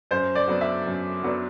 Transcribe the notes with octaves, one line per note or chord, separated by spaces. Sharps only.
F#2 C5
D5
F#3 B3 D4
E5
F#2
F#3 B3 D4